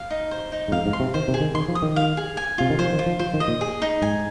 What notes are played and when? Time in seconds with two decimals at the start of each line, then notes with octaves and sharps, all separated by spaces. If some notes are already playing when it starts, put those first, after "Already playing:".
Already playing: F5
0.10 D#4
0.31 C5
0.52 D#4
0.68 G#2
0.72 F2 F5
0.86 G#2
0.93 C6
1.00 C3
1.14 D#3 C5
1.28 C3
1.34 G#4
1.41 D#3
1.54 D#3 C6
1.68 F3
1.75 D#6
1.82 D#3
1.96 F5
2.17 G#4
2.37 G#5
2.58 C3 F4
2.70 D#3
2.79 F3 C5
2.93 D#3
2.99 F4
3.06 F3
3.19 F3 C5
3.34 D#3
3.40 D#5
3.48 A#2
3.61 G#4
3.82 D#4
4.02 G#2 G#5